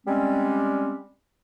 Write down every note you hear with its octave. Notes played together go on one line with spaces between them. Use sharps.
G3 G#3 C4 C#4